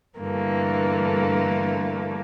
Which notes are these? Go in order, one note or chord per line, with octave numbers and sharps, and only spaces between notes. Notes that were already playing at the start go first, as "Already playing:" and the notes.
G2 D3 E3 A3 A#3